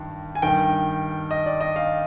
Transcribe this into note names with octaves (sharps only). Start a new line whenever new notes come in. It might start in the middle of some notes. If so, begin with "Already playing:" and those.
Already playing: G2 D#3
G#5
G2 D#3 G5
D#5
D5
D#5
F5